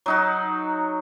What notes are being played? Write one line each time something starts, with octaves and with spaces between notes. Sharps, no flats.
F#3 D#4 F#4